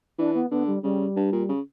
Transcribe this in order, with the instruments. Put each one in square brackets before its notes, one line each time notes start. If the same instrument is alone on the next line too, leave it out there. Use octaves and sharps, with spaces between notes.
[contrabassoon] E3 [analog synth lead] D4
[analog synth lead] B3
[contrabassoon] D3 [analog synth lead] B3
[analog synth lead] G3
[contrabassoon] C#3 [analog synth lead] G3
[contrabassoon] G2
A#2
C#3